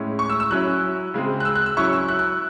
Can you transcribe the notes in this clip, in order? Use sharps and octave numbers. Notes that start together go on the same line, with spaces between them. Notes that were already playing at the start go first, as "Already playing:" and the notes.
Already playing: A2 G#3 C#4 E4
C#6
E6
E6
F#3 C#4 E4 F#6
C#3 G#3 C4
F#6
E6
F#6
E6
F#3 C#4 E4 C#6
E6
F#6
F#6